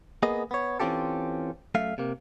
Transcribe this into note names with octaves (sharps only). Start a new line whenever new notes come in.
A#3 B3 G#4 D#5
B3 C#5
E3 C4 C#4 F4 G4 A4
F#2 A3 E5 F5
C3 A#3